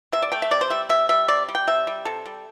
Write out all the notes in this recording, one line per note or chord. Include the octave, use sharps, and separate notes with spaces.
C3 E5
D5
A3 G5
E5
C3 D5
C5
G3 E5
C3 E5
G3 E5
C3 D5
G3
G5
C3 E5
G3
C3 A4
G3